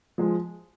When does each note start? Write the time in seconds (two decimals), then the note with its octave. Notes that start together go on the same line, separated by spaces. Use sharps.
0.18 F3 G#3